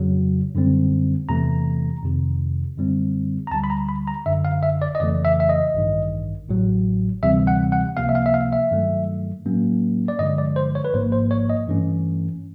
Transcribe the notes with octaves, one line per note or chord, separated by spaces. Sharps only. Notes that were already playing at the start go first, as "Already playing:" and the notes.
Already playing: F2 C#3 F#3
F#2 D3 G3 C4
E2 C3 E3 A3 A#5
F2 C3 D#3
F#2 D3 G3 C4
A#5
D2 D3 G3 A5
B5
A#5
B5
A#5
G1 F#2 D3 E5
F5
E5
D5
D#5
F2 C#3 E3 A3 D5
E5
E5
D#5
A1 G2 D#3
A1 A2 F#3
D2 C3 E3 G3 C4 E5
F#5
F#5
C#2 C3 F3 A#3 F5
E5
F5
E5
F5
E5
G2 D#3 F#3 A3
A2 F#3 A#3 C#4
D5
G2 D3 F3 G#3 D#5
D5
C5
C#5
B4
G#1 G#2 F3 A#3 C5
C5
C#5
D#5
G2 E3 A3 C#4